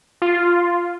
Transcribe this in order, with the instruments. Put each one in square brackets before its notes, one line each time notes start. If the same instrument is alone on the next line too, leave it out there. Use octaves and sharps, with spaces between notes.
[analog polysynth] F4